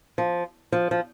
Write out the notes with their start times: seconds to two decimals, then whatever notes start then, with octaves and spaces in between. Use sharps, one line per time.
0.18 F3
0.72 F3
0.91 F3